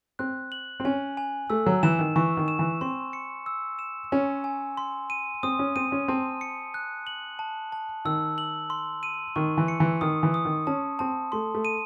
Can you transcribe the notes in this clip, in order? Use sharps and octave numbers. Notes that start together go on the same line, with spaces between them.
C4 F#6
F#7
C4
C#4 G#5
G#5
A3 E6
F#3
E3 E7
D#3
E3 C#6
D#3
E7
E3
C4 C6
C#7
E6
E7
C#4 G#5
G#5
C6
D#7
C4 D#6
C#4
C4 D#7
C#4
C4 A5
C#7
F#6
F#7
A5
A5
D#3 E6
F#7
C6
D#7
D#3 C#6
E3
C#7
E3
D#3 D#6
E3
D#6
D#3
C#4 A5
C4 A5
A3 C6
A3
D#7